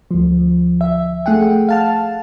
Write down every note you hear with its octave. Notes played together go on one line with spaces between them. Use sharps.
D2 F3
E5
A3 G#4 F#5 G5
F5 A5 F6